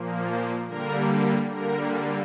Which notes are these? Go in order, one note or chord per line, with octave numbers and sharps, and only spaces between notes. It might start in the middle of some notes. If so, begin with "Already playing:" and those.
Already playing: A#2 F3 A#3
C5
D3 G3 A#3 A#4
D3 G3 A#3 A#4